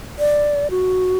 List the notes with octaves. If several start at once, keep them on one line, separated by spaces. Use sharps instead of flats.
D5
F#4